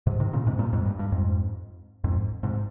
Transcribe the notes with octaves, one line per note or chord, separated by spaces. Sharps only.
G#2 C3
C3 D#3
A#2 C#3
G#2 C3
G2 A#2
F2 G#2
G2
G2
F2 G#2
F2 G#2
G#2 C3